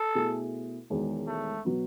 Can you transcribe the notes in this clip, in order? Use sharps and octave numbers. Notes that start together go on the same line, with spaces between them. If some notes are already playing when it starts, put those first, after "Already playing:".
Already playing: A4
B2 A3 E4 G#4
E1 E2 D#3 G#3
A3
B2 F#3 B3